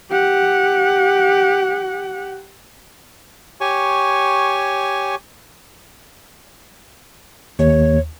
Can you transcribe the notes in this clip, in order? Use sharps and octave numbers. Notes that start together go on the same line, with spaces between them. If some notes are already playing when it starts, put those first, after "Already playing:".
G4 F#5
G4 C#5 G#5 C#6
D#2 C#5